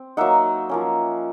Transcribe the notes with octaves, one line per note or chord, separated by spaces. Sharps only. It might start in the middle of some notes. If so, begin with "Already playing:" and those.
Already playing: C4
F#3 A#3 D#4 E5 F#5
F3 A#3 C#4